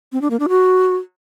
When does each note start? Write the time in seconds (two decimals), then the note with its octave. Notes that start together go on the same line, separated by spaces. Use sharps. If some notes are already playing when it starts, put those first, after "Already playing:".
0.12 C4
0.22 D4
0.31 A#3
0.40 D4
0.49 F#4